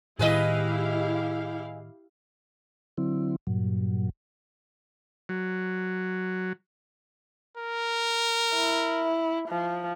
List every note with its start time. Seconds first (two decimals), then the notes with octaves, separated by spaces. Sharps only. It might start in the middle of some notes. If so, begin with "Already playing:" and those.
0.19 A2 D#3 E4 G4 G#4 B4 D#5 F5
2.98 D3 F#3 C4 E4
3.47 G2 A#2 F#3
5.29 F#3
7.57 A#4
8.54 E4
9.49 F3